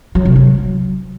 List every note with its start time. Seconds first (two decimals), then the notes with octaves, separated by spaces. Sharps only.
0.15 F#3
0.25 C3
0.36 F#3